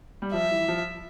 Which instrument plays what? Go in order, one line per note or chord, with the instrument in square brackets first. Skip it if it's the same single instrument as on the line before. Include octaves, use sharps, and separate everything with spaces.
[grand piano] G3
[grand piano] F3 [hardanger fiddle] E5
[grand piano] E3
F3